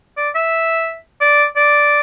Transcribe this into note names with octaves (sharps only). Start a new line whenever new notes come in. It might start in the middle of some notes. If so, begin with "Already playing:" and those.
D5
E5
D5
D5